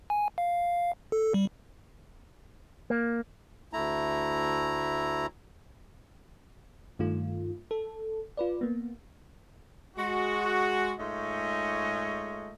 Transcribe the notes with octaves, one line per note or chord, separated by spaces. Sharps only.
G#5
F5
A4
G3
A#3
D2 A3 E4 A#5
G2 D#3 A3 F4
A4
F4 B4 D5
A#3 B3
G#3 F#4
G#2 G#3 A3 F4 C#5 D#5